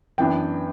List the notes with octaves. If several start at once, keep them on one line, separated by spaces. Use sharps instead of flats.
F#2 E3 B3 D4 G5